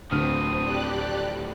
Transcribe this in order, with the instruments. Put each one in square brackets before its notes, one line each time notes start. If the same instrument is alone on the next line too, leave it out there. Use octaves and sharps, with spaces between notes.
[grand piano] D1 D3 F6 [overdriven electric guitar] A2 F3 [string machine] C4 [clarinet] D#6
[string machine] G4 D5 F#6